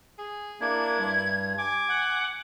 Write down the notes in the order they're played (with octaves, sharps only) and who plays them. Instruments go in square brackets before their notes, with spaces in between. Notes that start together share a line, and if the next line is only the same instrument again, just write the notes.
[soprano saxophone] G#4
[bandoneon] A#3 D4 [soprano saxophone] E4 [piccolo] G#6
[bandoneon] G2
[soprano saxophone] G#5 [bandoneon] D6
[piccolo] F#5